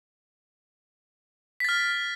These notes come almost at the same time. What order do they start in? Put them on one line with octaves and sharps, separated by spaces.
B6 A6 F6